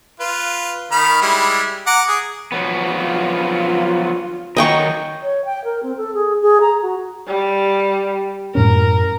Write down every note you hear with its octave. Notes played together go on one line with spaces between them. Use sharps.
F4 B4
D#3 B5 F6
G3 G#3 E4
F#5 A#5 D6
G#4
F3 F#3 B3
F4
D#3 F#3 A#4 D#5 G5 C#6
C#5
G5
A#4
C4
A4
G#4
G#4
A#5
F#4
G3
F#2 A2 C#4 A#4